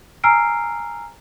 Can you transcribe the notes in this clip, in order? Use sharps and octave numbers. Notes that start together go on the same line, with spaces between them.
G#5 A#5 E6 F6 C7 D7